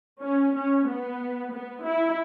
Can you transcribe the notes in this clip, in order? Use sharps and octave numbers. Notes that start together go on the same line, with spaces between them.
C#4
C#4
B3
B3
E4